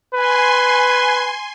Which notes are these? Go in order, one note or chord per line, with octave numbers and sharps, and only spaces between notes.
B4 G#5 C6